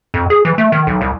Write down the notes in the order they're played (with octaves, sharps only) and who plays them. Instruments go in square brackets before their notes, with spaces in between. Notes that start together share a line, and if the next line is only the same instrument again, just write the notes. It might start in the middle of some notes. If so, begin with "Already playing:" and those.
[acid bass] F2
G#4
E3
A3
D#3
B1
C2